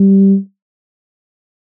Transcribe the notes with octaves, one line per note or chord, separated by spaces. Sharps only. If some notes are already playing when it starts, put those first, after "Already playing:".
Already playing: G3